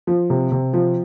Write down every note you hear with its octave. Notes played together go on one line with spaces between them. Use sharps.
F3
C3
C3
F3